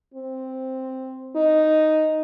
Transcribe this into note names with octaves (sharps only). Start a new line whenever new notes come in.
C4
D#4